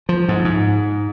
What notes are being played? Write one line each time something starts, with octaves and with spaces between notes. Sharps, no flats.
F3
G#2
G#2